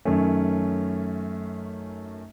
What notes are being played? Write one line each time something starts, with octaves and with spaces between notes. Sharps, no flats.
F#2 D#3 A3 C#4